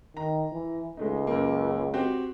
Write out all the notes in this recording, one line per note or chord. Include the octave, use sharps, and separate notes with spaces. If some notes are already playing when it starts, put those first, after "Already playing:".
D#3 A#5
E3
C#2 G#3 A3 D#4
F#2 A#3
C4 F#4 G4